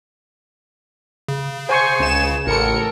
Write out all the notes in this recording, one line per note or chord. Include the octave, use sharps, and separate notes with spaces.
C#3
C5 G#5 C#6
C#2 E7
A1 A4 A#4 C#7